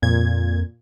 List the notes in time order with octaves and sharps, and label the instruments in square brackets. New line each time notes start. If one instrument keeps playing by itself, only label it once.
[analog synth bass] F2 [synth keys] A#2 G#6